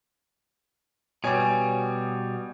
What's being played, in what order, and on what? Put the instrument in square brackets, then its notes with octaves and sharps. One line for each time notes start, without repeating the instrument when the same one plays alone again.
[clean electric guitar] B2 G3 [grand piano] C#5 G#5